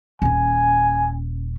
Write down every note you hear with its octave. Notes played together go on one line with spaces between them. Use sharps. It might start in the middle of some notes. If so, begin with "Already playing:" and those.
D#1 C#4 G#5